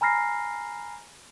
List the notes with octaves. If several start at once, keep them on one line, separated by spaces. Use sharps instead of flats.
G#5 A#5 B5 F6 A#6 C7